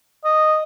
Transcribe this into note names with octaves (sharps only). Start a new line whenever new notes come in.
D#5